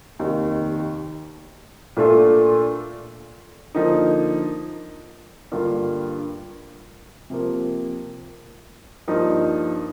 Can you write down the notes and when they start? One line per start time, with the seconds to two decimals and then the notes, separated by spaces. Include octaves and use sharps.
0.19 F1 D#2 D#3
1.97 A#2 A3 D4 F4 A4
3.75 D3 F3 A#3 D#4
5.52 G2 D3 G3 A#3 F4
7.30 C3 F3 A#3
9.07 G2 F3 A#3 D#4